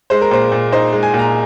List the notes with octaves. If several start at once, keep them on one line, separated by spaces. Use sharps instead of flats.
G#3 C5
A#4
A#2 C5
A#2
D#4 C5
G#3
G#5
A#2
A#5